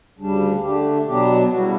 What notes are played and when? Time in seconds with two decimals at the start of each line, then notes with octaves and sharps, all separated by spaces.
0.18 D2 C#3 G3 D4
0.62 D3 A3 D4 G4
1.07 B2 F#3 B3 D4 G4
1.52 C#3 G3 B3 E4 F#4